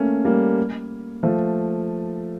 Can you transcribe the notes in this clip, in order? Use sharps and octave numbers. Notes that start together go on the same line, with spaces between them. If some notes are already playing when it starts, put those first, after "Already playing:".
Already playing: A3 A#3 C#4
G3 A#3
F3 A3